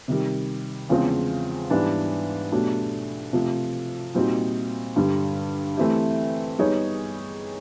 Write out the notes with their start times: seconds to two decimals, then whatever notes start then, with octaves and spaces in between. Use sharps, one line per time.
0.08 C3 D#3 G3
0.89 E2 C#3 F3 G#3 C4
1.70 G#2 E3 G3 B3 D4
2.52 B2 F#3 A3 D4 G4
3.33 C3 F3 A3
4.15 A#2 G3 C4 D#4 F#4
4.96 G2 D3 G3
5.77 E3 A3 C4 E4 G4
6.59 G3 B3 D#4 G#4 C#5